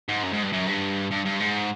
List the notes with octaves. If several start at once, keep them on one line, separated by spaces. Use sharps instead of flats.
G#2
F#2
G#2
G2
F#2
G2
G2
G2
G#2